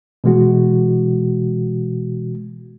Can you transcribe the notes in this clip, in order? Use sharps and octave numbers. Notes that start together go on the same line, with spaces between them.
B2 E3 G#3 F#4